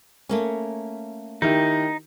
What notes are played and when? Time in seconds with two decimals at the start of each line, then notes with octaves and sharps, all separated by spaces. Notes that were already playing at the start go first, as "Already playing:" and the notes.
0.29 A3 A#3 C#4
1.42 D#3 D#4 E4 G4